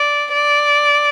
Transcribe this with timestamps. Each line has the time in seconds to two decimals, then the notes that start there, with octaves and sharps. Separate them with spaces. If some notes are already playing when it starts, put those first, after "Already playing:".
Already playing: D5
0.32 D5